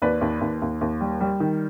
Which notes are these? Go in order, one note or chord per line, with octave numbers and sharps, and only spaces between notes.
D#2 B4 D5
D#2
D#2
D#2
D#2
G3
G3
D#3